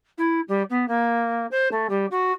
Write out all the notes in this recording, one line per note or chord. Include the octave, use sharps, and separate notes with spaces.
E4
G3
B3
A#3
C5
A3
G3
F#4